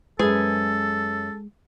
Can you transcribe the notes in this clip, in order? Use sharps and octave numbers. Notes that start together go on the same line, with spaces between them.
F#2 G#3 G#4 A4 B4